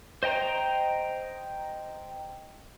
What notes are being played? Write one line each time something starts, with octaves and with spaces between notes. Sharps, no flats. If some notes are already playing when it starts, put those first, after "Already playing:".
C5 D#5 G5 A#5